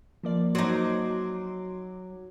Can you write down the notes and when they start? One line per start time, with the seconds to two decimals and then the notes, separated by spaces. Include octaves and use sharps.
0.23 F3 A#3 D5
0.55 F#3 D#4 C6 D6